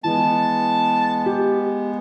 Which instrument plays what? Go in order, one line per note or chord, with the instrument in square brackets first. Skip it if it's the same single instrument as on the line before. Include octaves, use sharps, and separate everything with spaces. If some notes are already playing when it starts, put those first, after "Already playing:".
[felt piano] E3 [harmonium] G#3 B3 [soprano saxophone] A5
[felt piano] G4